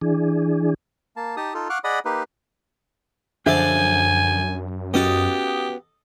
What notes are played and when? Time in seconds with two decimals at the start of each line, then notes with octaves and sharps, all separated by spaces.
0.02 E3 D4 G#4
1.16 A#3 A5
1.37 D#4 G4 A5 D#6
1.54 D#4 F4 A4
1.70 F5 F#5 C#6 D6 F6 F#6
1.84 G#4 D5 D#5 F#5 B5 D#6
2.05 A#3 D#4 G4 B4
3.46 F#2 D3 F3 D4 G#4 A4 E5 G#5
4.94 B3 C#4 F#4 G4 A4 D#5